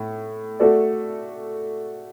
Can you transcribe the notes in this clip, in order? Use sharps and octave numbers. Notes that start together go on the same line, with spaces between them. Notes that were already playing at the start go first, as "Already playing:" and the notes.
Already playing: A2
A3 F#4 A4 D5